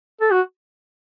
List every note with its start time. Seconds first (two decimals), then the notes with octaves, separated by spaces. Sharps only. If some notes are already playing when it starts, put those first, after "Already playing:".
0.21 A4
0.31 F#4